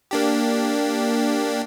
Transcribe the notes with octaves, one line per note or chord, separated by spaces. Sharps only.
A#3 D4 G4